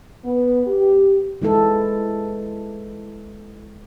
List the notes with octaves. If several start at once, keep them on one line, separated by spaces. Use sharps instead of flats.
B3
G4
E3 G#3 E4 A4